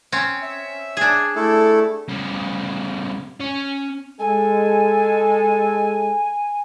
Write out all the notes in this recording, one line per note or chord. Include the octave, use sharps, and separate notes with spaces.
C4 C#4
E5
D4 G#4
A3 E4 A4
C#3 G3
C#4
G#3 A4 G#5